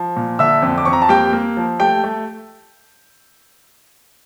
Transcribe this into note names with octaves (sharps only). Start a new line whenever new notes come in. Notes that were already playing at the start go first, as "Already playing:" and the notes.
Already playing: F3
A#2
D3 E5 E6
F2
D6
F2 C#6
A#5
A5
A#3 G4 G5
A#3
F3
A3 G4 G5
A3